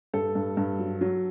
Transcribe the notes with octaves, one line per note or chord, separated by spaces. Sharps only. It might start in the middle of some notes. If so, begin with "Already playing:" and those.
G2 A4
G2
G2
F#3
F#3